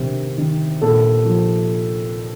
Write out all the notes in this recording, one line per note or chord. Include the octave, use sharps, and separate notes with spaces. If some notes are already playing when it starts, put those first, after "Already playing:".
Already playing: C3 D#3
D#3
A#2 A4
F3